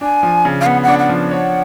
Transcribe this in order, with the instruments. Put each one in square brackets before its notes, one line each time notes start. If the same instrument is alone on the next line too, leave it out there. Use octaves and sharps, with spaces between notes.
[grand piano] D4 [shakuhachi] G#5
[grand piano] F3
C#3
[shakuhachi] F5
[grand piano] B3 [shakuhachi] F#5
[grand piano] D4 [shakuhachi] F#5
[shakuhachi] F#5
[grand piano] F3
[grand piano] C#5 [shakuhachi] F#5